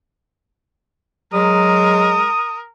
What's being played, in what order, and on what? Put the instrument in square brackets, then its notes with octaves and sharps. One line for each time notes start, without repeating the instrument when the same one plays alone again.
[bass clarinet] F#3 [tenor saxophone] G#3 [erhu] A#4 [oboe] D#6